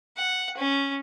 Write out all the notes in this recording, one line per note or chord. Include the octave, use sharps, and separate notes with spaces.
F#5
C#4